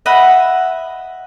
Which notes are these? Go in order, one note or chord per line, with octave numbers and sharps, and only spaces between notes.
D#5 E5 F#5 B5